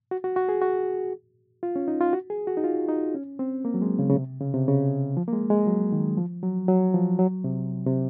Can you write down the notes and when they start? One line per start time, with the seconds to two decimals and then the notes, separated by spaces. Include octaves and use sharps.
0.11 F#4
0.24 F#4
0.36 F#4
0.49 G#4
0.61 F#4
1.63 F4
1.76 C#4
1.88 D#4
2.01 F4
2.13 F#4
2.30 G#4
2.47 F#4
2.57 D#4
2.64 F4
2.89 D#4
3.15 C#4
3.39 C4
3.65 A#3
3.74 F#3
3.82 G#3
3.99 C#3
4.09 C#3
4.16 C3
4.41 C#3
4.54 C3
4.68 C#3
5.17 F3
5.28 A#3
5.33 G#3
5.50 G#3
5.67 F#3
5.92 D#3
6.17 F3
6.43 F#3
6.68 F#3
6.94 F3
7.19 F#3
7.44 C3
7.86 C3